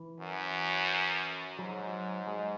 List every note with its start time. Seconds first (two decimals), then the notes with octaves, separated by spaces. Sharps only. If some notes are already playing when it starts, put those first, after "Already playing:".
Already playing: E3
0.20 F#2
1.58 G#2 F#3
2.27 G#3